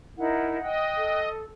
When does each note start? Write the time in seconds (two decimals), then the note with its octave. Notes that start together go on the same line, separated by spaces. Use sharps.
0.18 D#4 E4 A#4 F#5
0.63 D#5 G5 F#6
0.97 A4